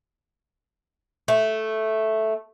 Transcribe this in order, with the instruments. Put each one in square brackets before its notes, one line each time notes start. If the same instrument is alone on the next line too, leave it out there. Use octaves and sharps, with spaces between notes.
[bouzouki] A3